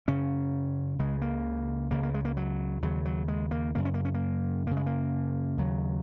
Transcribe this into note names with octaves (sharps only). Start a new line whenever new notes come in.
F#2 C#3 C#4
C#2 C#3 G#3
A#3
C#2 C#3 A#3
A#3
G#3
A#3
F#3
D#2 C#3 F#3
F#3
G#3
A#3
F#2 C#3 A#3
C#4
A#3
C#4
A#3
F#2 C#3 A#3
G#3
A#3
D#2 C#3 F#3